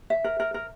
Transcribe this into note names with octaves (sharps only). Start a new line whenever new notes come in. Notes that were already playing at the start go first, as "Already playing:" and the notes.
E5
A#4
A#4
A#4